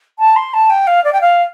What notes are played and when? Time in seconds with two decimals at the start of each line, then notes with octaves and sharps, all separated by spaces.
0.19 A5
0.36 C6
0.54 A5
0.70 G5
0.87 F5
1.04 D5
1.13 G5
1.21 F5